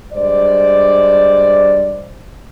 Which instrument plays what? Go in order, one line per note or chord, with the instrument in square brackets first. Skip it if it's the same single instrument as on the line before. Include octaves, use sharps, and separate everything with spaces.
[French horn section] G2 G#3 C5 D5